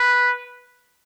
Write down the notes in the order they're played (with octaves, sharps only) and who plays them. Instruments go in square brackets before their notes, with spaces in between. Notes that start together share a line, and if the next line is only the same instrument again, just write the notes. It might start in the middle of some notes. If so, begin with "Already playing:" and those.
Already playing: [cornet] B4